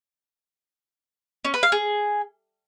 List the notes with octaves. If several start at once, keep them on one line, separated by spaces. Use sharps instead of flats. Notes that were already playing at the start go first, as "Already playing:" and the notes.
C#4
B4
F5
G#4